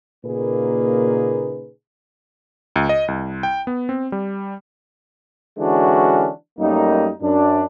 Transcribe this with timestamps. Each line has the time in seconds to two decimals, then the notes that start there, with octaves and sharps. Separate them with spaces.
0.24 A#2 C#3 A#3 D#4 G#4 B4
2.76 C#2
2.89 D#5
3.08 C2
3.43 G5
3.67 B3
3.89 C4
4.12 G3
5.58 D3 E3 G#3 C#4 D4 F#4
6.59 F#2 G3 A3 A#3 D#4
7.23 F#2 D4